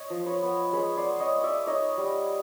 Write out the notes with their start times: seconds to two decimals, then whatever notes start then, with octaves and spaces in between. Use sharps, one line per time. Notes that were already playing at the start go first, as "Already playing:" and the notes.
Already playing: C#5 D#5
0.10 F3
0.26 B4 C#5
0.42 B3
0.73 G#3 B4 C#5
0.97 C5 D5
1.05 B3
1.20 C#5 D#5
1.36 B3
1.43 D5 E5
1.66 D#4 C#5 D#5
1.98 G3